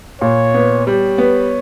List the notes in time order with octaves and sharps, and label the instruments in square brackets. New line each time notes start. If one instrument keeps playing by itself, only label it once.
[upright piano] A#2 [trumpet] C#5
[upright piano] B3
[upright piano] G3 [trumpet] C#5
[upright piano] B3